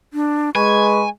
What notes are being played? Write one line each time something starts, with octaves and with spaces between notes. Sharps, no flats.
D4
G#3 B4 G#5 C#6